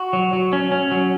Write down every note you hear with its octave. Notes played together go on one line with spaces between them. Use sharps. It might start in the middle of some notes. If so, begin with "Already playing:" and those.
Already playing: F#4
F#3
F#3
C#4
C#4
F#3